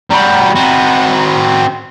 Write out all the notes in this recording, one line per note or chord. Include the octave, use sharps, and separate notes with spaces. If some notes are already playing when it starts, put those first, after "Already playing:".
G3 F#4 A#5 B5
C4 F#4